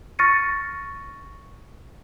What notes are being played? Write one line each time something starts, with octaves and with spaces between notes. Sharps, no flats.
C#6 F6 A6 A#6 C#7 D#7